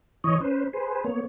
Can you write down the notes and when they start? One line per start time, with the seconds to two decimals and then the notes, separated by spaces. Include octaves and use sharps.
0.24 E3 C#5 D#5
0.41 C#4 B4 C5
0.73 G#4 B4 C5
1.04 A#3 B3 C#5